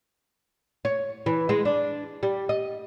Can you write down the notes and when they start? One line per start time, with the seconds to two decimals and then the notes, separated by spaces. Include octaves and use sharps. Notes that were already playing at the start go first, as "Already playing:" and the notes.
0.85 C#5
1.26 E3
1.49 G#3
1.65 D4
2.23 G3
2.49 D#5